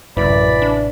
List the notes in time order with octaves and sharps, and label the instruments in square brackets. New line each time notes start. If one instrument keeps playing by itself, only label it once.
[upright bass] A1 C3 [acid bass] F#2 [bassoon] E3 [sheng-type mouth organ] D5 B5
[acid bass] D4